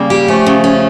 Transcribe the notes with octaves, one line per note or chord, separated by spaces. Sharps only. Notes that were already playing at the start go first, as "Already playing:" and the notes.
Already playing: C#3 G3 A#3
G4
F3 A3 C#4
C#3
C#4